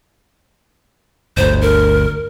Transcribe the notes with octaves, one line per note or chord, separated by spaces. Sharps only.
G1 D2 C5
A#4